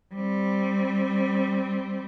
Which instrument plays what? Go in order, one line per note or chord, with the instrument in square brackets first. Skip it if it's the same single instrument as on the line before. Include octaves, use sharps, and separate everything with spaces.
[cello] G3 C4